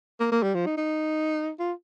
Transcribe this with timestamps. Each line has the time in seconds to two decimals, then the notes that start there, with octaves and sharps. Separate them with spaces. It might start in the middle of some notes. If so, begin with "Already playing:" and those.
0.20 A#3
0.31 A#3
0.43 G3
0.54 F3
0.66 D#4
0.77 D#4
1.59 F4